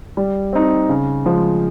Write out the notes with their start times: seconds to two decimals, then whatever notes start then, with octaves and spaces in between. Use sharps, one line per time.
0.17 G3
0.53 C4 D#4
0.89 C#3
1.26 F3 G#3